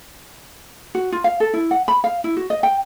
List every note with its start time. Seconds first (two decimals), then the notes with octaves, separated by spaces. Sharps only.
0.95 F#4
1.12 F4
1.24 F5
1.40 A4
1.54 E4
1.71 F#5
1.88 B5
2.04 F5
2.24 E4
2.37 F#4
2.50 D#5
2.63 G5